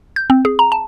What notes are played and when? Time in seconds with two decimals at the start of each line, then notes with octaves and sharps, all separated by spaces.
0.16 G6
0.30 C4
0.45 G#4
0.59 A#5
0.72 A5